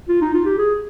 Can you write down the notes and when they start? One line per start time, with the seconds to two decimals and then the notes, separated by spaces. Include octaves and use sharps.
0.09 F4
0.21 D#4
0.34 F4
0.45 G4
0.58 G#4